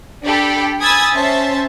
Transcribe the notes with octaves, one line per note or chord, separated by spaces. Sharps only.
D4 G4 A4 B5
G#5 B5 D#6 E6 G#6 A6
C#4 C5 E5 A5